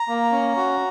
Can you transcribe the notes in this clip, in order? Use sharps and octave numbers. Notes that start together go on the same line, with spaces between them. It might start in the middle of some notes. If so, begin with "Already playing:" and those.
Already playing: A#5
A#3
C#4
F#4